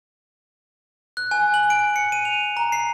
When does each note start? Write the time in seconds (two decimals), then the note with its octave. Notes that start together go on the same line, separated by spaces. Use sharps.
1.17 F#6
1.31 G#5
1.54 F#7
1.70 D7
1.96 C#7
2.12 D#7
2.25 F7
2.57 A#5
2.72 C7